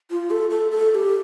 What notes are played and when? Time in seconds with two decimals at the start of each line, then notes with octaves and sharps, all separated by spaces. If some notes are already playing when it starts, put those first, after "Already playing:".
0.11 F4
0.31 A4
0.50 A4
0.71 A4
0.91 A4
0.95 G4